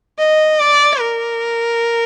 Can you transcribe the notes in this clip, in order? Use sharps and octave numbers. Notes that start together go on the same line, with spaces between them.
D#5
D5
A#4